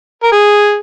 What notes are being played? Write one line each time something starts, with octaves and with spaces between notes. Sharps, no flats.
A#4
G#4